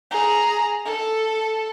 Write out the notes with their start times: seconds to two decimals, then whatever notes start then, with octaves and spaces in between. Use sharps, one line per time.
0.11 G#4 A#5
0.86 A4